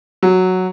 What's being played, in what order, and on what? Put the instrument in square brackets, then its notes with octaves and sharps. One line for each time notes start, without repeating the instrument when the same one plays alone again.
[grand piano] F#3